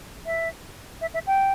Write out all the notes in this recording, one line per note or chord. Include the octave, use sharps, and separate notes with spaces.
E5
E5
E5
G5